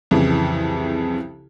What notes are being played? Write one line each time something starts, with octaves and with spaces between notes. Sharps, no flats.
C2 F2 C#3 E3